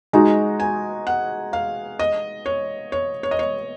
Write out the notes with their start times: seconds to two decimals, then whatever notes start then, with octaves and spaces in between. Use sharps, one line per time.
0.13 G#3 D#4 F#4 A#5
0.60 G#5
1.07 F#5
1.53 F5
1.99 D#5
2.46 C#5
2.92 C#5
3.23 C#5
3.31 D#5
3.39 C#5